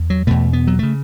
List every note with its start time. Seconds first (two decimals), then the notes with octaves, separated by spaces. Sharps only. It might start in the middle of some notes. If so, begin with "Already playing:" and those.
Already playing: E2
0.10 F#3
0.27 E2 B2 A3
0.53 B3
0.67 F#3
0.79 C#3 A3